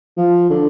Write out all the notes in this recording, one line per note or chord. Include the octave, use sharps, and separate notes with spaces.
F3
D3